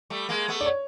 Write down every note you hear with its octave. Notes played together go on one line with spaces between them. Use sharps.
G3 A3
G#3 A#3
A3 B3
D5
C#5